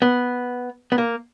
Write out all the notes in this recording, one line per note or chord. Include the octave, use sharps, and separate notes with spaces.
B3
B3
A#3